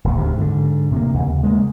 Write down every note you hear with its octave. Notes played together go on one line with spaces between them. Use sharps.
D1 D#2
D2 C3
G#2 D3
C3 A#3
D#2 C#3
G#3 A#3